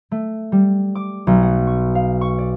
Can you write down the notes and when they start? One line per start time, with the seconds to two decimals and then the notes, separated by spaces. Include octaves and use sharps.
0.11 A3
0.52 G3
0.95 D6
1.27 B1
1.42 F#5
1.67 C#6
1.95 F5
2.21 C#6
2.38 D5